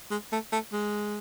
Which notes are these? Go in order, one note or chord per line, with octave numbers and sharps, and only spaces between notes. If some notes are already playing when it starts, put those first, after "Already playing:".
G#3
A3
A3
G#3